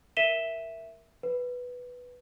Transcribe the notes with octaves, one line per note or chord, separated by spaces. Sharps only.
A#4 E5 B6 D#7 E7 G7
B4